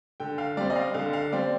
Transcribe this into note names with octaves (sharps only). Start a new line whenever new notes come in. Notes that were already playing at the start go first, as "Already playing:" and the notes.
D3 G5
F5
G3 C4 D5
D#5
F5
D3 F5
F5
G3 C4 D5